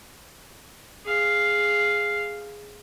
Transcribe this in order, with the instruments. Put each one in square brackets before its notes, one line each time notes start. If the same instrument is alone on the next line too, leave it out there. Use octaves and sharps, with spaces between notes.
[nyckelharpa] G#4 F5